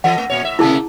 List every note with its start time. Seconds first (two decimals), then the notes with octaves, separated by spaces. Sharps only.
0.04 E3 A4 D#5 F#5
0.18 A3
0.30 A#2 C#5
0.43 A2 E5
0.59 C3 A3 A#3 E4 G#4 A5